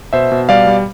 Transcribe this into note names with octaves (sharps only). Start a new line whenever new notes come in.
B2 C5 E5
B2
G3 D5 F5
G3